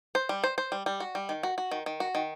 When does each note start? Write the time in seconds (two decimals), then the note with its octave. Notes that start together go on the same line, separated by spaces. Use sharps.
0.15 C5
0.29 G3
0.44 C5
0.58 C5
0.72 G3
0.86 G3
1.00 F#4
1.15 G3
1.29 D#3
1.43 F#4
1.58 F#4
1.71 D#3
1.86 D#3
2.00 F#4
2.15 D#3